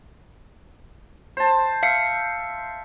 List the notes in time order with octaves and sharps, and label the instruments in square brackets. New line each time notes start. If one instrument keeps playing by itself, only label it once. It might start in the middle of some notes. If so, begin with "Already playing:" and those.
[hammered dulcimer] C5 A5
[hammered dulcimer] E5 [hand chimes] F5 C7 C#7